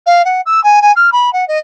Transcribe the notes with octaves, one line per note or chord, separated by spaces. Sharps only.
F5
F#5
E6
G#5
G#5
F6
B5
F#5
D#5